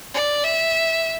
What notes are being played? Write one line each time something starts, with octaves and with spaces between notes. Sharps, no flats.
D5
E5